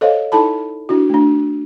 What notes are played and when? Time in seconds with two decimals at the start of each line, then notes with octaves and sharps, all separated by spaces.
0.01 A4 C5 C#5 D#5 F5
0.32 D#4 E4 A4 A5 B5
0.89 D4 E4 F#4
1.10 A3 D4